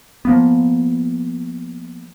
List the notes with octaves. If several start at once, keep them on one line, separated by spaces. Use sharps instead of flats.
F3 A#3 B3